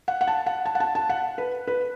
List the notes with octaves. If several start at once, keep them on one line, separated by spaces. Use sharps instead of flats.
F#5
F#5
A5
F#5
A5
F#5
A5
A5
F#5
B4
B4